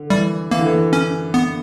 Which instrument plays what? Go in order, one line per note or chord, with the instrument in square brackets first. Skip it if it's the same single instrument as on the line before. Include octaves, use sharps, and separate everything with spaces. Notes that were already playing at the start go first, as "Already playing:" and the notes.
Already playing: [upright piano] D3
[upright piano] E3 [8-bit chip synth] G3
[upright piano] E3 [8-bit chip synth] A#3
[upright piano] D3
E3
[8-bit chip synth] C#4
B3